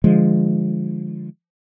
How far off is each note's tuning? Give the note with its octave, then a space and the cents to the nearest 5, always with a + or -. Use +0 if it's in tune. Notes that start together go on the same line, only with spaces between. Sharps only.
D3 +30 F3 +0 G#3 +0